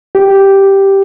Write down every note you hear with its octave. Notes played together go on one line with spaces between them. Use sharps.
G4